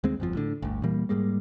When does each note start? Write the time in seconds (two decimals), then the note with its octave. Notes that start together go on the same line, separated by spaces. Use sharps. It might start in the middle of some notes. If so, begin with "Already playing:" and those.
0.04 D#2 G#3 C4
0.20 G1 F2 F3
0.35 A2 D3
0.62 G1 D2
0.83 A#2 E3 G3 A#3
1.09 G#2 G3 G#3 A#3